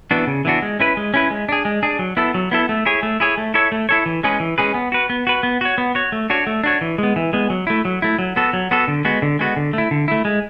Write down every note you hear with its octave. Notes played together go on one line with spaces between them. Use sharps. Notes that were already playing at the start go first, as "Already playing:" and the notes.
E3 B3 D4 F#4
C#3
E3 B3 D4 F#4
G#3
C#4 E4 B4
G#3
C#4 E4 B4
G#3
D4 G#4
G#3
D4 G#4
F#3
B3 E4 A4
F#3
B3 E4 A4
A3
E4 G#4 C#5
A3
E4 G#4 C#5
A3
E4 A4 C#5
A3
E4 A4 C#5
E3
G#3 C#4 G#4 B4
E3
G#3 C#4 G#4 B4
B3
F#4 B4
B3
F#4 B4
B3
F#4 C#5
B3
F#4 C#5
A3
D4 F#4 C#5
A3
D4 F#4 C#5
E3
G#3 B3
E3
G#3 B3
F#3
A3 E4
F#3
A3 E4
F#3
B3 F#4 A4
F#3
B3 F#4 A4
D3
G#3 B3 F#4
D3
G#3 B3 F#4
D3
A3 E4
D3
A3 E4
G#3